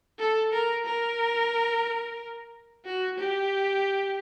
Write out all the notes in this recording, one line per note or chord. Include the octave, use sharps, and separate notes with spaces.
A4
A#4
A#4
F#4
G4